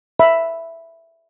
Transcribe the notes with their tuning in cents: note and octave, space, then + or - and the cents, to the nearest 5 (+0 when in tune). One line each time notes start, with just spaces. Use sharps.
E5 +5 B5 +0